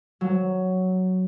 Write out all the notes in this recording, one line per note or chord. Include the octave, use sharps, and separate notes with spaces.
F#3